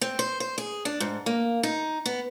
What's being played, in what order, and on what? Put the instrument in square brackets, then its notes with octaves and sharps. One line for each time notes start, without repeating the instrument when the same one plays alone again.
[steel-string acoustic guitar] C4
C5
C5
G#4
D4
G#2
A#3
D#4
B3